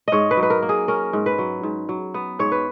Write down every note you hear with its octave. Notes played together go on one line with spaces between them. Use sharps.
G#2 C#5 D#5
B4
F#3
B4
A#4
A#3
G#4
C#4 A#4
G#2
B4
F#3
G#2
F#3
B3
G#2 C#5
B4